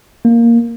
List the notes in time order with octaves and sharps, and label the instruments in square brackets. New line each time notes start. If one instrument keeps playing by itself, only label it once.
[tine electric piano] A#3